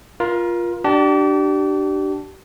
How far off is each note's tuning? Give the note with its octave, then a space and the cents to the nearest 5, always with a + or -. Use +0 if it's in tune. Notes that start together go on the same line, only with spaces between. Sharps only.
F4 +0 A#4 +30
D4 +15 G4 -35 A5 +0